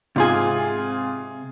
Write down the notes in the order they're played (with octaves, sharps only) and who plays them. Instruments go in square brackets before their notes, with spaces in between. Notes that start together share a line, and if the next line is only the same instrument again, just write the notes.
[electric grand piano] G#2 F4 G#4 [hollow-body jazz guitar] C3 C4 G#5